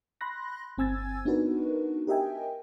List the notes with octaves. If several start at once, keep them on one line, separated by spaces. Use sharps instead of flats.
B5 C6 F#6 A#6
G1 C4 G#5 E6 G#6 A6
B3 D4 D#4 F#4 A#4 B4
G4 A#4 D#5 E5 G5 G#5